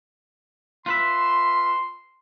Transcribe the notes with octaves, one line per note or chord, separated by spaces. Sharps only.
F4 B4 E5 C6